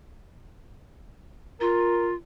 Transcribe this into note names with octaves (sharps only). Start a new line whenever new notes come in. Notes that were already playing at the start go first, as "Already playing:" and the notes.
F4 A#4